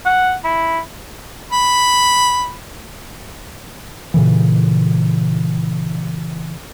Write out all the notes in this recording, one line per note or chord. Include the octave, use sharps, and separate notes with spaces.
F#5
E4
B5
A#2 C#3 E3